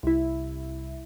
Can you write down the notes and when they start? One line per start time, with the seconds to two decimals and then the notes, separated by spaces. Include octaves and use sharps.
0.03 C2 E4